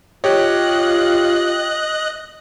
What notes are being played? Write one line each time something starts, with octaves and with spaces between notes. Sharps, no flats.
F4 G4 C#5 D#5 F#6